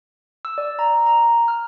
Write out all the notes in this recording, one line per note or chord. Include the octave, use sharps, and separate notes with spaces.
E6
D5
A#5
A#5
F6